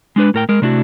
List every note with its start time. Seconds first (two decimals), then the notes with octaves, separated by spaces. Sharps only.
0.16 G#3 D4 B4
0.34 A2 A#4 G5
0.49 G#3 A#4
0.62 C3 A3 D4 E4 F#4